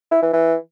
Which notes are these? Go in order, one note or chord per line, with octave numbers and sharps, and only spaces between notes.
E4
E3
E3